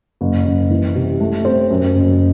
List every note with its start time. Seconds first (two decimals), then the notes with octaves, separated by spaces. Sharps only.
0.21 F#1
0.45 F#1
0.70 E3
0.95 C3
1.20 A3
1.45 C4
1.70 F#2
1.95 F#1